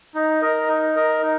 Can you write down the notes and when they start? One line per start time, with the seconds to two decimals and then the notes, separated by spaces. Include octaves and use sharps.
0.15 D#4
0.42 A#4 D#5
0.69 D#4
0.95 A#4 D#5
1.22 D#4